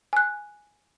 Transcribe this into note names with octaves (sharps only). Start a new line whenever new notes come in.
G#5 F#6